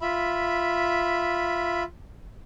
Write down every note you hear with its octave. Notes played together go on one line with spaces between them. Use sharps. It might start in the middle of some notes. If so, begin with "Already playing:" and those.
F4 E5 B5